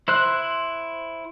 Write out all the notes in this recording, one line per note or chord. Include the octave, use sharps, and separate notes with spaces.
E4 C5 F#6